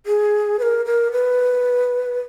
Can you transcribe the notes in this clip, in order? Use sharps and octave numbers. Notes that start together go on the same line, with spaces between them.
G#4
B4
A#4
A#4
B4